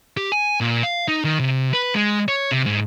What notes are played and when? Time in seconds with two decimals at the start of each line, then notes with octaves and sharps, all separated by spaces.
0.17 G4
0.32 G#5
0.61 A#2
0.83 F5
1.08 D#4
1.24 D#3
1.39 C3
1.73 B4
1.95 G#3
2.28 C#5
2.51 C3
2.66 G#2